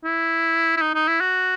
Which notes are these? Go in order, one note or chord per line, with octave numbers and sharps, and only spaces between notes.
E4
E4
D#4
D#4
E4
F#4